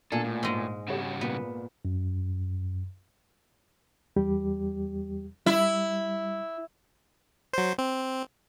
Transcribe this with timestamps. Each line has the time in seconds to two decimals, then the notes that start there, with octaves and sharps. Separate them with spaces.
0.12 A#2 D4 G#4 A4 G#5
0.24 A2
0.43 G#2 G#3
0.88 C#3 G3 F#4 G4 C#5 E7
1.21 A#2 B3
1.85 F#2
4.16 E2 G3 G4
5.46 G3 E4
7.53 F#3 C5
7.78 C4